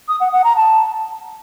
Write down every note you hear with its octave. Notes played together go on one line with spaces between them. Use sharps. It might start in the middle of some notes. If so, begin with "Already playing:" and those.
D#6
F#5
F#5
A#5
A5